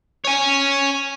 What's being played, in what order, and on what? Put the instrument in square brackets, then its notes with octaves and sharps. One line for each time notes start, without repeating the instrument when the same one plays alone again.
[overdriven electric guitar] C#5 G#5